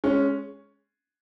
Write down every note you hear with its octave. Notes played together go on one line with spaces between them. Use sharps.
G#3 C#4